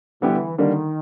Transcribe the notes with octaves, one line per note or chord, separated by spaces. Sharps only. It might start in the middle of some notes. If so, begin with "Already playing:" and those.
D3 E3 G3 B3 E4 G4
D3 D#3 G3 A#3 D4